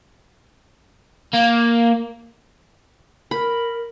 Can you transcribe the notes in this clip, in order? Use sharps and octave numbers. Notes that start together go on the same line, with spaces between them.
A#3
A#4 B5